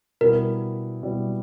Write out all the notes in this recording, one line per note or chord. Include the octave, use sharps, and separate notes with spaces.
B2 G3 B3 E4 A#4
B2 G3 B3 E4